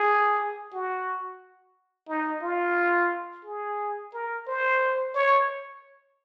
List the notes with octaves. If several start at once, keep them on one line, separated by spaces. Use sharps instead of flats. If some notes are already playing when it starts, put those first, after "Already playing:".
Already playing: G#4
F#4
D#4
F4
G#4
A#4
C5
C#5